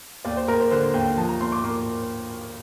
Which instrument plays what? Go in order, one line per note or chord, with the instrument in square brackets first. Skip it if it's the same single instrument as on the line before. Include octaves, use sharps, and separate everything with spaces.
[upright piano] D#2 D5
C5
D#2 A#4
C5
D3 C5
D#2 G5
F3 A5
A#5
A#2 C6
D6
A#3 D6